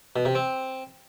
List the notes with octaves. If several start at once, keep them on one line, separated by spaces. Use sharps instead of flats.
B2
C3
C4